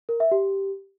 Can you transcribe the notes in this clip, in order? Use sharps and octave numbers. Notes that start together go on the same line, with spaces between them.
A#4
E5
G4